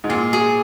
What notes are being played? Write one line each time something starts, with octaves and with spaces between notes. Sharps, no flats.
G#2
A#2 G#4
G#4